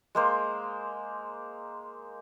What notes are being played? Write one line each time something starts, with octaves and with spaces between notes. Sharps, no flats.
G#3 A#3 C5